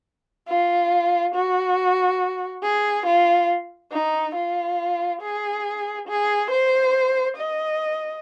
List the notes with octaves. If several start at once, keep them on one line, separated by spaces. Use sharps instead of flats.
F4
F#4
G#4
F4
D#4
F4
G#4
G#4
C5
D#5